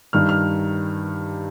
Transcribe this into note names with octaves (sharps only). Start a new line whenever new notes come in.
G2 D#3 G3 F6
F6